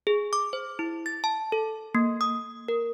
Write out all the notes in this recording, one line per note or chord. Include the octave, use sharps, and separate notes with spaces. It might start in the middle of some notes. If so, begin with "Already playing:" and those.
G#4
D6
C5
E4
A6
A5
A4
A#3
D#6
A#4